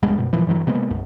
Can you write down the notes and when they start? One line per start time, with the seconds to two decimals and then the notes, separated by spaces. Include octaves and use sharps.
0.03 D1 G2 G#3 B3
0.18 F#2 B2
0.33 E2 A#2 E3 F3
0.47 G2 E3 F#3
0.67 C3 G#3 A#3 B3
0.90 B1 F#2